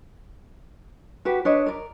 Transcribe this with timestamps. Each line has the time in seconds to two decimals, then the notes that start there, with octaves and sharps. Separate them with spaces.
1.25 F#4 G4 B4
1.45 D4 B4 C#5 D#5
1.66 A#4 D5